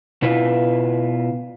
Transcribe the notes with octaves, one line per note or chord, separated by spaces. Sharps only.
B2 E4 F4 B4